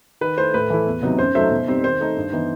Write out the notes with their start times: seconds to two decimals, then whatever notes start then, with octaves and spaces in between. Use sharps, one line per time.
0.21 D#3 B4
0.37 A3 E4 C5
0.54 A2 B4
0.70 E3 A3 E4
0.87 E2
1.02 C3 F#3 B3 D#4
1.19 F#2 C5
1.35 F#3 A3 D#4 C5 E5
1.51 B2
1.68 G3 C4 D#4
1.84 D#3 C5
2.00 A3 D#4
2.16 G2
2.32 E3 B3 D#4